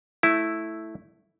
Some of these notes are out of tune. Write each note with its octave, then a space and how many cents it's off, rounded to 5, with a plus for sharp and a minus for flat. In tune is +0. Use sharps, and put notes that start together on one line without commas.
A3 +0 E4 +0